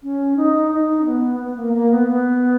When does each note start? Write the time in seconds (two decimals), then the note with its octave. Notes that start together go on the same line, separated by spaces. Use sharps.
0.03 C#4
0.37 D#4
0.71 D#4
1.01 C#4
1.05 B3
1.40 B3
1.56 A#3
1.73 A#3
1.91 B3
2.08 B3